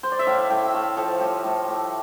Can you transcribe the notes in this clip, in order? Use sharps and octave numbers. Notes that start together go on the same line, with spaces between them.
C5
D5
E5
A2 F5
A2 G5
E5
A3 F5
F3 A4
A2 G4
A2
A3